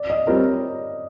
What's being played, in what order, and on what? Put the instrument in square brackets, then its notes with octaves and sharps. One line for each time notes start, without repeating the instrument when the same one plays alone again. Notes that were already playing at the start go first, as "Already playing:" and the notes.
Already playing: [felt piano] D5
D#5
[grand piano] G3 C4 F4 A#4 [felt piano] C#5